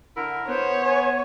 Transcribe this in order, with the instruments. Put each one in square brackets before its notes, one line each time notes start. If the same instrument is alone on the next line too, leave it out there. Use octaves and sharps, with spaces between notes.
[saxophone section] D3 E4 A#4
[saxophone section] B3 [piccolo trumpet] C5 [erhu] C#5
[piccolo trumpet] G#5